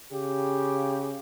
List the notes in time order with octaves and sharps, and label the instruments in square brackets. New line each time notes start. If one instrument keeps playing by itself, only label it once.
[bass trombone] C#3 [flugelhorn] G4